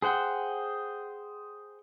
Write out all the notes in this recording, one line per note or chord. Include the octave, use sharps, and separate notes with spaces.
G#4 C5 F#5 G5